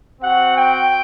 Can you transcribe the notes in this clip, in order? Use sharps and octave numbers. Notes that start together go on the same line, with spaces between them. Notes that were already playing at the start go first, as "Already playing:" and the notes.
C4 F#4 F#5
G5